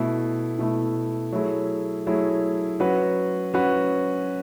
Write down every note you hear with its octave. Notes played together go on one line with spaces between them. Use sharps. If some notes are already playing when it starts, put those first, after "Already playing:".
Already playing: B2 A3 E4
B2 A3 E4
F#3 A3 E4 G#4
F#3 A3 E4 G#4
F#3 C#4 F#4 B4
F#3 C#4 F#4 B4